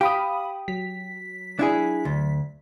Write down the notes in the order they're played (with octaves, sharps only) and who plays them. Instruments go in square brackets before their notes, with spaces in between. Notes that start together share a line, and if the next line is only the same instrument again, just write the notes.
[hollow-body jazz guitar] G4 [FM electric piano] F5 B5 D#6
[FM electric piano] F#3 B6
[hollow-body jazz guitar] D4 E4 G#4
D2